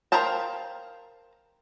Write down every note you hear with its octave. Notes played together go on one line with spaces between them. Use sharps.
A#4 C5 F5 G5 A5